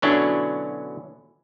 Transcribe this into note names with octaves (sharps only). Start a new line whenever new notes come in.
B2 D3 F#3 C#4 D4 E4